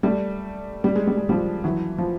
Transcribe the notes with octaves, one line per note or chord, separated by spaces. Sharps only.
G3 A3
G3
G#3
G3
G#3
F3 G3
E3 F#3
F3